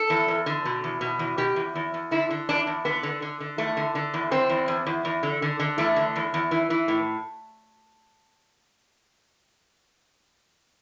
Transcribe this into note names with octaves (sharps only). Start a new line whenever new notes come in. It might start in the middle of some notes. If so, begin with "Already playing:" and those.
Already playing: A4
E2
E2
D3
B2
E2
B2
E2
B2 G4
E2
E2
E2
D3 E4
D3
E2 D4
E2
D3 B3
D3
D3
D3
E2 A3
D3
D3
E2
D3 C4
E2
E2
E2
E2
D3
D3
D3
E2 A3
D3
E2
E2
E3
E3
A2